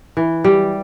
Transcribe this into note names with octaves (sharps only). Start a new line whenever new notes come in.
E3
G3